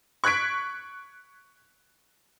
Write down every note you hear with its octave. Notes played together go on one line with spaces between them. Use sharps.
C#6 F#6 G#6 B6 D7